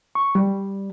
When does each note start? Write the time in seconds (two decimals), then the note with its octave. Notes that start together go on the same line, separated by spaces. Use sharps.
0.15 C#6
0.35 G3